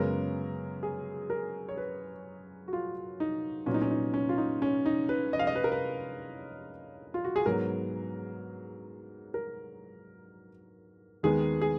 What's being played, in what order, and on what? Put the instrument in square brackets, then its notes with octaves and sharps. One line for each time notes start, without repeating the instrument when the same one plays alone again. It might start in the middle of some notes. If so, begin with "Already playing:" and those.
Already playing: [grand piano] F#2 C#3 G#3 B3 A#4
G#4
A#4
C#5
B4
F#4
F4
D#4
A#2 F#3 B3 C#4
D#4
C#4
D#4
C#4
F4
D#4
C#4
D#4
B4
D#5
F5
D#5
B4
A#4
B4
F4
F#4
G#4
G#2 F#3 B3 A#4
A#4
D#2 D#3 G#3 B3 G#4
G#4